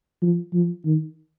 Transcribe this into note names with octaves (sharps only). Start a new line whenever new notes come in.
F3
F3
D#3